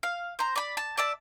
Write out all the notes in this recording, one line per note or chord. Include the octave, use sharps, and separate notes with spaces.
F5
C5 A#5
D5 B5
A5
D5 E5 A5